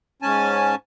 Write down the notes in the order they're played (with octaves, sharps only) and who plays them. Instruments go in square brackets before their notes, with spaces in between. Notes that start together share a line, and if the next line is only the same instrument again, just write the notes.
[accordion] G#2 C#4 G#5 A5